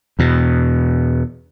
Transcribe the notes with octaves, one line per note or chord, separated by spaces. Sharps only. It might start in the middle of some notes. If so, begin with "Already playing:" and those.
E2 B2